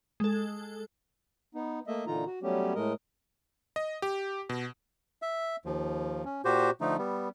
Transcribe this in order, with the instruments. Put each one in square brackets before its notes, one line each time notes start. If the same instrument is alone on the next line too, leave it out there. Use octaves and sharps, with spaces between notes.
[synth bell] G#3 A4
[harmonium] B3 D#4
A3 A#3 D#5 E5
A#2 D3 E3 D#4 F4 A#5
F#4
F#3 G3 A3 B3 C#4 G4
A2 G#3 A3 A#4 D#5
[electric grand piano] D#5
G4
B2
[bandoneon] E5
D#2 F3
C#4
A#2 F#4 G4 C5
D3 F3 A3 D#4
G3 B3